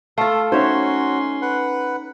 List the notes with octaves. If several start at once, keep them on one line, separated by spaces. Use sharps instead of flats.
A3 F4 A4 F5
C#4 D#4 F#4 C5 C#5 E5 C6
B4 F#5